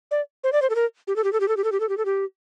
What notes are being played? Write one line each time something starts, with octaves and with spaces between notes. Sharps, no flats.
D5
C5
D5
C5
A4
A#4
G4
A4
G4
A4
G4
A4
G4
A4
G4
A4
G4
A4
G4